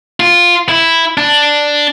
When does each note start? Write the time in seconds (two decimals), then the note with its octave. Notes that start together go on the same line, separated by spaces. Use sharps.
0.20 F4
0.69 E4
1.18 D4